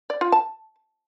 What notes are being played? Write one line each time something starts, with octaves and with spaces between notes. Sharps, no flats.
D5
F4
A5